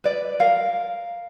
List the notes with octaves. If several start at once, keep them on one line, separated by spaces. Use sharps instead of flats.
B4 D5
A#4 F5